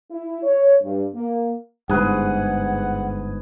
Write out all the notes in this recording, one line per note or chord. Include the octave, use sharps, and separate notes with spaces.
E4
C#5
G2
A#3
G1 G#2 G#4 B4 F#5